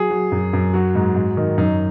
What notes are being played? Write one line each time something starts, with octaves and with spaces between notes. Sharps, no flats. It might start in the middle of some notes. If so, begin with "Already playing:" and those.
Already playing: F#3 G#4
F#3
F#2
F#2
F#3 F#4
G#2
G#2
D#3
F#2 D#4